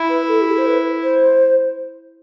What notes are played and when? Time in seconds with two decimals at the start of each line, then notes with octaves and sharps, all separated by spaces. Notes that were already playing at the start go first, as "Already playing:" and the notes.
Already playing: E4
0.09 B4
0.28 A4
0.41 G4
0.48 A4
0.58 C5
0.67 B4
1.03 C5